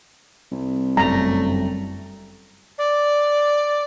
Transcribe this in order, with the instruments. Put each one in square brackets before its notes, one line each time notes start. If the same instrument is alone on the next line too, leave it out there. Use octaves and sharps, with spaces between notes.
[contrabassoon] C2
[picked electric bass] G1 F#2 G3 [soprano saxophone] A3 [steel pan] A#5
[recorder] D5